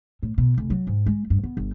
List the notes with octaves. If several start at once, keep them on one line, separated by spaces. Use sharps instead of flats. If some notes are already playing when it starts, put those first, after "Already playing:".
A2
B2
F1
F#3
G#2
G#3
G2
B3
G1